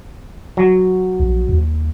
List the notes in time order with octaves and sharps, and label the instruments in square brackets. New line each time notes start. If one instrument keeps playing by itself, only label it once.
[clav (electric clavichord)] F#3
[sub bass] A#1
D#2